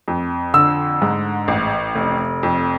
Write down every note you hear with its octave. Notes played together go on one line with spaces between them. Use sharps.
F2
D3 E6
G#2
A1
F1
F2